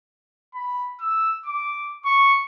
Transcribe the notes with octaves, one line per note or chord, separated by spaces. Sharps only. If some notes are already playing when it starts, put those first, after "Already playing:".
B5
E6
D6
C#6